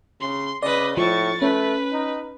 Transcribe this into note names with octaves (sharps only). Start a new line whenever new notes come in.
C#3 C6
C#3 B4 D5 D#5
A2 F3 C#6 A6
A3 C#4 B4
D#4